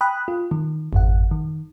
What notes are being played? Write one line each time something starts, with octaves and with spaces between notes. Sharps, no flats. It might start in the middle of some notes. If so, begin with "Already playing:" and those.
G5 B5 D#6 F#6
F4
D#3
G#1 F2 F#5
D#3